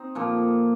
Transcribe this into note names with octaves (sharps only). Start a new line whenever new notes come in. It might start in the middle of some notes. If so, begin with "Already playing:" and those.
Already playing: C4 D#4
A#2 F3 A#3 A4